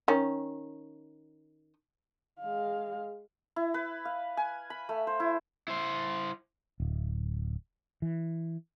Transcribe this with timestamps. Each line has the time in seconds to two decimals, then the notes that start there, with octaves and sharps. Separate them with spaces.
0.08 D#3 C#4
2.40 G#3 F5
3.56 E4
3.74 B4
4.05 F5
4.37 G#5
4.70 B5
4.89 A3
5.07 C5
5.20 E4
5.68 E4 C5
6.80 D1
8.02 E3